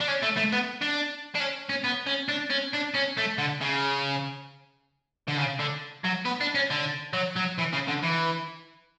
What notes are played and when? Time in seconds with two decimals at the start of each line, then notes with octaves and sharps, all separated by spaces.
0.01 D4
0.08 C#4
0.23 A3
0.37 A3
0.52 B3
0.81 D4
1.35 D4
1.40 C#4
1.69 C#4
1.84 B3
2.07 C#4
2.29 D4
2.50 C#4
2.73 D4
2.94 C#4
3.17 A3
3.38 D3
3.61 C#3
5.28 D3
5.37 C#3
5.59 D3
6.04 F#3
6.25 B3
6.41 D4
6.55 C#4
6.70 D3
7.13 F#3
7.36 F#3
7.58 E3
7.73 C#3
7.88 D3
8.03 E3